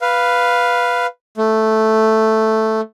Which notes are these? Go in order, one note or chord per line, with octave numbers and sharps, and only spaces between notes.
B4 F5
A3